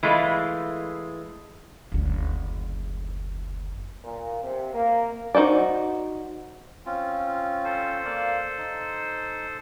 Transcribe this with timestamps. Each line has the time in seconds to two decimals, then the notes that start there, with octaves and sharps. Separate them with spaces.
0.03 E3 G#3 A3 F4
1.92 F#1 D2
4.03 A#2
4.42 C3
4.74 A#3
5.35 D#4 F#4 C5 D5
6.86 C4 C#4 F4
7.65 A4 C5
8.05 A#3 D5 F5
8.58 D#4